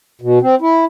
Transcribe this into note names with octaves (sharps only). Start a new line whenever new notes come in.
B2
C4
E4